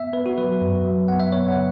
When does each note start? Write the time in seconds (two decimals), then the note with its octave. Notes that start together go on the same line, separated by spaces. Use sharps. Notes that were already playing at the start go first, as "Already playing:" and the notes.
Already playing: B3 E5
0.13 B3 B4
0.26 F#4
0.38 F#3 B4
0.61 F#2
0.85 F#3
1.08 B3 F#5
1.20 E5
1.32 B3 C#5
1.48 F#5
1.56 C#3